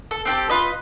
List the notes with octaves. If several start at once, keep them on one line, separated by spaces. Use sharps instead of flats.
A4
C4 G4 A4
F4 B4 D#5